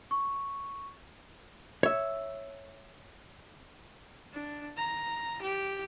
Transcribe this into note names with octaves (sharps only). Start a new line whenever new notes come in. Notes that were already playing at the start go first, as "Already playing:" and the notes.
C#6
C#5 E5
D4
A#5
G4